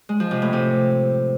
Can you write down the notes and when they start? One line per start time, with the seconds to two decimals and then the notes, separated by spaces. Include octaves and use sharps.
0.09 G#3
0.20 F3
0.31 C3
0.42 A2
0.53 C3